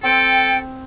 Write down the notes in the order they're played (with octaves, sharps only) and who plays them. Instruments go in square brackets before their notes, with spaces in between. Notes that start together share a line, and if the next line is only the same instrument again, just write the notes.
[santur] C4 [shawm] A4 [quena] G5